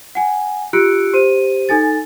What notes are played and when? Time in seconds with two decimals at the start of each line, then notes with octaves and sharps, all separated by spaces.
0.15 F#5 G#5
0.73 F4 G4 E6 F#6 C#7 D7
1.13 G4 C5 D#7
1.69 D#4 A4 G#5 A6